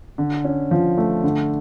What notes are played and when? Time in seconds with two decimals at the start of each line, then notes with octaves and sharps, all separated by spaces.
0.18 D3
0.44 C#4
0.71 F3
0.98 A3
1.23 D3